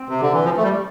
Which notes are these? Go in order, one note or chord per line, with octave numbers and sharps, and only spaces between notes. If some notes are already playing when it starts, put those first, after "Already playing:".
Already playing: C4
C3
D3
E3
F3
A3
G3